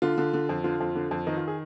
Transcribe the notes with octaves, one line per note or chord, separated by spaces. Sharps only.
D3 F4
D3
D3
F2
D3 F4
F2
D3
F2
D#3 D#4
F4
G#4